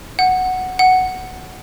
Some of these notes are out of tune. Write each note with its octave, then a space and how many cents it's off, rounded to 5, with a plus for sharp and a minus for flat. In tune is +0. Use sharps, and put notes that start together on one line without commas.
F#5 +0
F#5 +5